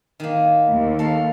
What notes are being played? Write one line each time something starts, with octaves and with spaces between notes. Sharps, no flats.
D#3 A#3
D#2
A4 F5